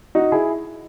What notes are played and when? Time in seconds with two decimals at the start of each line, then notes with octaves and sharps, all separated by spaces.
0.15 D#4 F#4
0.32 E4 G#4